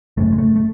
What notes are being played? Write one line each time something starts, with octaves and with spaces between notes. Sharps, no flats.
G#1 F#2 C#3 A3
G#3
A3
A3